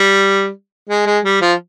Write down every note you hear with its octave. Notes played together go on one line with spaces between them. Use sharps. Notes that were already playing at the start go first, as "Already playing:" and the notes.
Already playing: G3
G#3
G#3
G3
F3